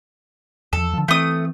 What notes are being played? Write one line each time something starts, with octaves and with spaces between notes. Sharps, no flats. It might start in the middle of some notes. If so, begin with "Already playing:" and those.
E2 F3 A4
D3 F3
E3 A3 C4 D#6